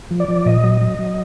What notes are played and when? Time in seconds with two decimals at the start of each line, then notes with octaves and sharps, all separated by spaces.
0.11 F3
0.20 D5
0.28 F3
0.46 A#2 D#5
0.64 F#3
0.81 F#3
0.98 F#3